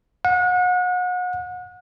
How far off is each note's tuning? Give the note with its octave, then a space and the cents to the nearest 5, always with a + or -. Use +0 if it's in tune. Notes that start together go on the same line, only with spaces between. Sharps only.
F#5 -35